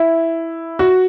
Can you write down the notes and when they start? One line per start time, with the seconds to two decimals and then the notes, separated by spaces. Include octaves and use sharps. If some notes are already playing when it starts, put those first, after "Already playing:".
Already playing: E4
0.79 F#4